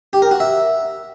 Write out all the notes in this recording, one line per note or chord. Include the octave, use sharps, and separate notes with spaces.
G4
A#4
F#4
E5